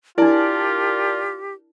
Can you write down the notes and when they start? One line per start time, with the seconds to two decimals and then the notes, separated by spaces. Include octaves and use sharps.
0.18 D4 E4 F4 G4 A#4 D5 A5